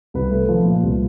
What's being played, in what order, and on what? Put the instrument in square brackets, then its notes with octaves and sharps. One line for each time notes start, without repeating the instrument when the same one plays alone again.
[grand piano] C2 B4
A3
F3
A#2
C2